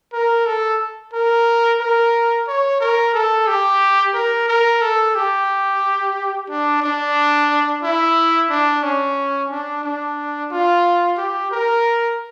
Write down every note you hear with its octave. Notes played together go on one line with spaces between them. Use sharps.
A#4
A4
A#4
A#4
C#5
A#4
A4
G4
A#4
A#4
A4
G4
D4
D4
E4
D4
C#4
D4
D4
F4
G4
A#4